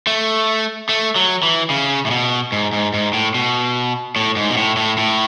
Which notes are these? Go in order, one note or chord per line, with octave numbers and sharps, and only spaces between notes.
A3
A3
F#3
E3
C#3
A2
B2
G#2
G#2
G#2
A2
B2
A2
G#2
B2
A2
A2
A2